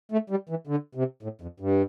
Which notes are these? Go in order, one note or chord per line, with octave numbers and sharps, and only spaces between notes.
A3
G3
E3
D3
C3
A2
F2
G2